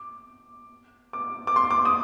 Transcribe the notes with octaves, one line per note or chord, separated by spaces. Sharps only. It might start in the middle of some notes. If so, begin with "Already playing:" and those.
Already playing: D6
D6
D6
C6
D6
D#6